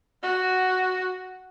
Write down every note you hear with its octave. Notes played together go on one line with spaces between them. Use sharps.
F#4